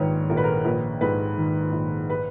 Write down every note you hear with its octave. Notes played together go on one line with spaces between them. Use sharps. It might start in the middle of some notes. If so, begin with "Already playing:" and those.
Already playing: A#1 G#2 D#3 B4 C#5
A#1 A#4
B4
A#4
A#1 B4
G#2 B4
D#3
A#1
B4